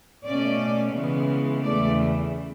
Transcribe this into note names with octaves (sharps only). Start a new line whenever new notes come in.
B2 A3 C#4 D5
C#3 E3 G#3 B3
E2 C#3 E3 A3 D5